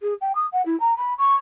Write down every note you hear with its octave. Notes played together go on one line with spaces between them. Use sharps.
G#4
G5
D#6
F#5
E4
A#5
B5
C#6